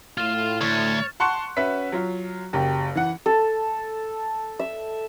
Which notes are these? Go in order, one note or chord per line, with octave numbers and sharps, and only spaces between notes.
A2 F4 F5 F6 E7
D2 C#5 C#6 A6
F#5 A5 C6 C#6 F#6 C#7
C#4 F#4 B4 E5 B6
F#3 F4
F#1 G4
E3 F#5
A4
E5